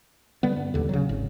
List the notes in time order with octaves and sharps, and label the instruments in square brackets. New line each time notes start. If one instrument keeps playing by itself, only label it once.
[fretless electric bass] D3 G3 B3
G2
A1 D#2 D3
C#3 F#3
G#1